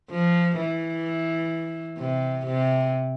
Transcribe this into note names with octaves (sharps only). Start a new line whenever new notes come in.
F3
E3
C3
C3